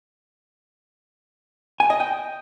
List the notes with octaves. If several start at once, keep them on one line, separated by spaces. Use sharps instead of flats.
G#5
D#5
G5